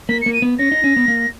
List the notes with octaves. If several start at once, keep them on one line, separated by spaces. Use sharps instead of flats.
A#3 B6
C#7
A#3
D#7
B3
C#4 A#6
D#4
C#4
B3
A#3